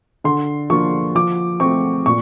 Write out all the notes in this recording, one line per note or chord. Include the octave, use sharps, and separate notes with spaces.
D3 C6
F3 A#3 D4 F4 C#6
F3 D6
A3 C4 C#6
A#2 C#6